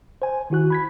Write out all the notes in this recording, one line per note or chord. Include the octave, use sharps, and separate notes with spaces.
C5 G#5
D#3 E4 F#4 F#6
B5 G#6 B6